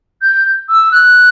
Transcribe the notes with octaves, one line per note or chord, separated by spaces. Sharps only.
G6
E6
F#6